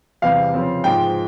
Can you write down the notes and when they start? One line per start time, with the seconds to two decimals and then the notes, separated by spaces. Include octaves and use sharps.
0.22 E2 C3 G3 F5
0.54 C#3 F3 C4
0.84 G#2 F3 G#3 G5